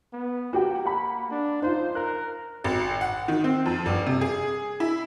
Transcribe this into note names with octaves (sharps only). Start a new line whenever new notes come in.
B3
A#3 F#4 G4 G5
F#5 B5
D4
D#4 F4 C5
A#4 F#6
G#1
F#5
D#3
C4
F2
G1
C3
G#4
E4